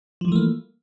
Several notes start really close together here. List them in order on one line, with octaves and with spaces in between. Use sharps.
F3 G3 E3 A3 A#3